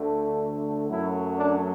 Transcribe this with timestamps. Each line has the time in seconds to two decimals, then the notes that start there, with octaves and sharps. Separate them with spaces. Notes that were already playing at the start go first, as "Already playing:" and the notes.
Already playing: D2 D3 A3
0.90 F#2 F#3 A3 E4
1.38 D4